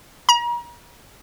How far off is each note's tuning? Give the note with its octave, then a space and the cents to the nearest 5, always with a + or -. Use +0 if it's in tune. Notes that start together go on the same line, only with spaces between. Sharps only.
A#5 +40